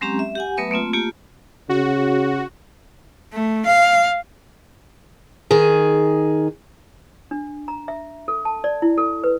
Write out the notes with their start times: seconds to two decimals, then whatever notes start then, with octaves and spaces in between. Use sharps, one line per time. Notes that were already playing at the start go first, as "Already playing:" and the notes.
0.01 F#3 G#3 C4 C#4 G4 A#5
0.19 E5
0.35 G4 F#5 G#5
0.57 F#3 A3 B3 B4 E5 D#6
0.71 A3 A#3 C4 F4
0.93 A3 A#3 F4 G4
1.69 C#3 F#4
3.33 A3
3.66 F5
5.51 D#3 G#4
7.31 D4
7.68 A#5
7.88 E5
8.28 A4
8.45 A5
8.64 D5
8.82 E4
8.98 A4
9.24 B4